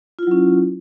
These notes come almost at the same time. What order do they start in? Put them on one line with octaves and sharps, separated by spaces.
F4 E4 F#3 C#4